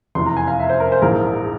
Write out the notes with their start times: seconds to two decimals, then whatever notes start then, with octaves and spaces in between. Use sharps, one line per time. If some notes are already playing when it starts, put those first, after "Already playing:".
0.15 F1 E2 E3 C6
0.26 A#5
0.37 G#5
0.48 F5
0.59 E5
0.70 C5
0.80 A#4
0.92 C5
1.02 A#1 G#2 E3 A#3 A#4